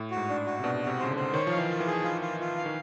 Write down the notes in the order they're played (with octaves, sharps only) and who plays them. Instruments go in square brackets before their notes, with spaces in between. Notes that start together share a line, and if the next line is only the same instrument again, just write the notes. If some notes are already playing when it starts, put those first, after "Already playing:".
Already playing: [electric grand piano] A2
[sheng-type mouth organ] F#4
[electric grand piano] G#2
[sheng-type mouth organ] D4
F#4
[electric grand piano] C3
[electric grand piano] B2 [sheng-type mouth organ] D4
[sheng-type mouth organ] F#4
[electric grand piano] C3
[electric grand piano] C#3 [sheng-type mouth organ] C5
[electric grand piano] D3
[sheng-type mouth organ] C5
[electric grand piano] D#3 [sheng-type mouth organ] C#5
[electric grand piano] F3 [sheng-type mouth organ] F5
[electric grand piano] E3
[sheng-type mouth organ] F4
[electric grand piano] E3
[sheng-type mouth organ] G#4
[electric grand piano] F3 [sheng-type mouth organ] F4
[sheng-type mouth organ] F4
F4
F5
[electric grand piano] D#3